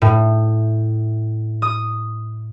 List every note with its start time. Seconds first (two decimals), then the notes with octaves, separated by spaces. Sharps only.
0.02 A2
1.62 D#6